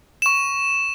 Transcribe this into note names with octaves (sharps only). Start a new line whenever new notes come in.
C#6 E7